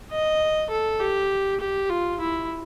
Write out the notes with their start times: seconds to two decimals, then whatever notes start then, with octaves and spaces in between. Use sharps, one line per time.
0.12 D#5
0.71 A4
1.00 G4
1.60 G4
1.90 F4
2.20 E4